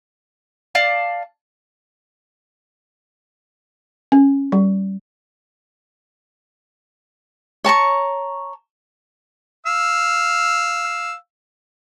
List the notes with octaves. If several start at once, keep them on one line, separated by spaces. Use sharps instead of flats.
D5 F5 A5
C#4
G3
C#5 A5 A#5 C#6
F5 E6